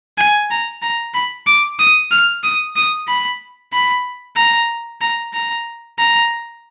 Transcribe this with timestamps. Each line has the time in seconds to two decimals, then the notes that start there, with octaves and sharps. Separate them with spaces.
0.18 G#5
0.51 A#5
0.82 A#5
1.14 B5
1.47 D6
1.80 D#6
2.12 F6
2.44 D#6
2.76 D#6
3.08 B5
3.73 B5
4.37 A#5
5.01 A#5
5.34 A#5
5.99 A#5